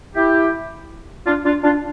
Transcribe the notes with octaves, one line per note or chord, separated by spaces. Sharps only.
E4 G4
D4 F4
D4 F4
D4 F4